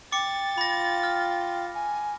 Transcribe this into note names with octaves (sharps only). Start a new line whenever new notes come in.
G5 D6 A6 C#7
F4 B5 A#6
F6
G#5